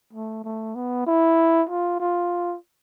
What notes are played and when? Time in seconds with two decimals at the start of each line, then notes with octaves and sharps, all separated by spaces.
0.13 A3
0.44 A3
0.75 B3
1.07 E4
1.69 F4
2.00 F4